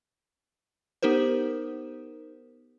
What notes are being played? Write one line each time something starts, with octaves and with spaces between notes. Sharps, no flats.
B3 D#4 G4 A#4 C5